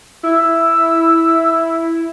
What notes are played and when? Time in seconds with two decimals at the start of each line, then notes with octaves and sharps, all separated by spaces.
0.23 E4 E6